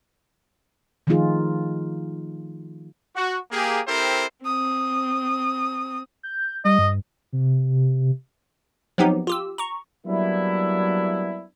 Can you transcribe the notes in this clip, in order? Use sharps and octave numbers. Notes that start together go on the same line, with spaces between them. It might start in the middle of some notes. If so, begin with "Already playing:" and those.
D#3 F3 A3 D#4 F4 G#4
F#4
A#3 G4 G#4
C4 E4 G4 A4 A#4 C5
C4 D#6
G6
G3 D#5
G2
C3
F3 F#3 B3 C4 D#4 G4
F4 G4 E6
A#5 C#6
F#3 G3 A#3 B3 D4 E4